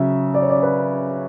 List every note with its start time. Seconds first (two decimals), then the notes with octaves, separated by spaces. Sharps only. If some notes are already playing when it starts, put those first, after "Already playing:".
Already playing: C#3 F#3 E5
0.34 D5
0.42 C#5
0.50 D5
0.63 B4